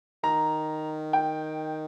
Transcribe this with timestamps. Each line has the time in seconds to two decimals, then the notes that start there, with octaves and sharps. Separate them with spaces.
0.24 D#3 A#5
1.13 G5